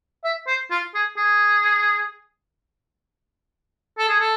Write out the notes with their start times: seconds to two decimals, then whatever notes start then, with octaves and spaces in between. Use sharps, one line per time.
0.24 E5
0.47 C5
0.71 F4
0.94 G#4
1.17 G#4
3.98 A4
4.08 G#4
4.19 A4